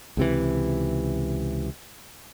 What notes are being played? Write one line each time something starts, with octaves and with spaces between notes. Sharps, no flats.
C#2 C3 E3